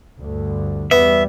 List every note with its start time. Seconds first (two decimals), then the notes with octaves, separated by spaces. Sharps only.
0.19 D2 G2 D3
0.91 E2 G3 B3 E5